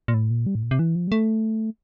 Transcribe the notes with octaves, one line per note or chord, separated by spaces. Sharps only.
A#2
A2
A#2
G3
A2
A#2
C3
E3
F3
G3
A3